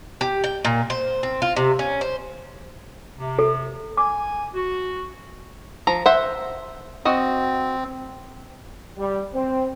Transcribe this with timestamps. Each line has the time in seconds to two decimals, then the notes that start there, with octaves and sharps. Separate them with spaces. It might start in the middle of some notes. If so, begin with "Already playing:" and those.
0.21 G4
0.44 G5
0.65 A#2
0.90 C5
1.23 C4
1.42 F4
1.56 C3
1.79 C#4
2.01 C5
3.18 C3
3.39 A4
3.97 G#5 D6
4.54 F#4
5.87 F3 A#5
6.06 C5 E5 F#5
7.05 C4 F#4 D#5
8.98 G3
9.34 C4